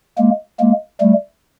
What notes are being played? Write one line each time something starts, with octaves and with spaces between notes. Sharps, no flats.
G#3 A#3
G#3 A#3
G3 A3